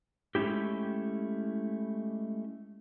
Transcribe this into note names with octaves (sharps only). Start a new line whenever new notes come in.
G#3 A3 C#4 E4 G4